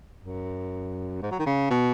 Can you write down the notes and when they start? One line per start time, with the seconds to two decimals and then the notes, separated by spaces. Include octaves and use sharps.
0.23 F#2
1.22 G#2
1.31 F#3
1.39 D#3
1.46 C#3
1.70 B2